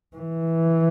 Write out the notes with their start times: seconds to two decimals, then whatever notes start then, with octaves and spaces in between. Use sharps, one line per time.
0.16 E3